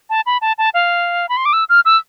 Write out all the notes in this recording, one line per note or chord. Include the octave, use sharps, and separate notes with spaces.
A5
B5
A5
A5
F5
B5
C6
D6
E6
F6
E6